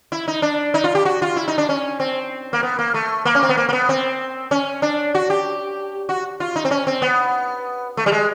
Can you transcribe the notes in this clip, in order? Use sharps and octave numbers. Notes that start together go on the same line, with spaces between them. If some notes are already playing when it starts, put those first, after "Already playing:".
E4
D#4
D4
D#4
F4
G4
F#4
F4
E4
D#4
D4
C#4
C4
A#3
B3
A#3
A3
A#3
C#4
C4
B3
A#3
A#3
B3
C4
C#4
D4
F#4
G4
F#4
F4
D#4
C4
C#4
C4
B3
A3
G3
G#3